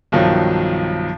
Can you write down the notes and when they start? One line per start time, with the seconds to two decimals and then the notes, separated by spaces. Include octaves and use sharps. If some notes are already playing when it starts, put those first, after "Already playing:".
0.12 B1 G2 D#3 F3 F#3